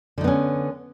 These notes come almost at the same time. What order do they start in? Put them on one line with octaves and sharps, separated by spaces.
D3 D#4 B3 C#4